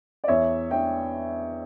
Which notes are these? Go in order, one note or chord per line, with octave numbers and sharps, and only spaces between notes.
D5
E2 C#5 E5
D4 E5 G5